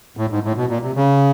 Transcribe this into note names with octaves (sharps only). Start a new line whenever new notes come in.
A2
G#2
A2
B2
A#2
C3
C#3